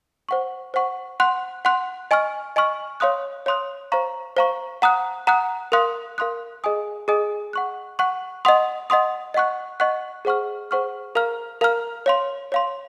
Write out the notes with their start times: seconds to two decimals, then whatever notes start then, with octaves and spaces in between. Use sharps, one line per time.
0.29 C5 F#5 C#6
0.74 C5 F#5 C#6
1.20 F#5 C6 F#6
1.65 F#5 C6 F#6
2.11 D#5 G#5 C#6 F6
2.56 D#5 G#5 C#6 F6
3.00 C#5 F5 C6 D#6 F#6
3.46 C#5 F5 C6 D#6 F#6
3.92 C5 F5 A#5 C#6
4.37 C5 F5 A#5 C#6
4.82 F#5 A#5 D#6 F#6
5.27 F#5 A#5 D#6 F#6
5.72 A#4 F5 C6 D#6 F#6
6.18 A#4 F5 C6 D#6 F#6
6.64 G#4 D#5 G#5 D#6
7.08 G#4 D#5 G#5 D#6
7.53 F#5 C#6 F#6
7.99 F#5 C#6 F#6
8.45 D#5 F#5 C6 D#6
8.90 D#5 F#5 C6 D#6
9.34 D#5 F#5 C#6 F#6
9.80 D#5 F#5 C#6 F#6
10.25 G#4 C5 F#5 C#6 F6
10.71 G#4 C5 F#5 C#6 F6
11.15 A#4 F5 A#5 F6
11.61 A#4 F5 A#5 F6
12.06 C#5 F5 C6
12.52 C#5 F5 C6